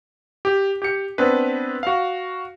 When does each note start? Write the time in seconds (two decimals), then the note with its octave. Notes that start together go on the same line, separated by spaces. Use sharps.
0.45 G4
0.82 G4 C#7
1.18 B3 C4 D4 B4
1.83 F#4 F5